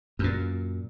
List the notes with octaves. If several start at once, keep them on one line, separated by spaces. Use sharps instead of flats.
F#2 A#2